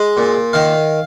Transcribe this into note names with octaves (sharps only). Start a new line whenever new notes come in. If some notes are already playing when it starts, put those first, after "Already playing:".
Already playing: G#3 D#5
A#2
D#3 F5